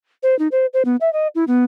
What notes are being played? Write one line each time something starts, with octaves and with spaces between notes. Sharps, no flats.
C5
D#4
C5
C5
B3
E5
D#5
E4
B3